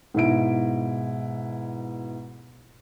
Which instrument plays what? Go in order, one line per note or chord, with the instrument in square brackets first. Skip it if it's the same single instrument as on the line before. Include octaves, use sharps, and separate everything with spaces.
[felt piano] G#2 B2 E4 D7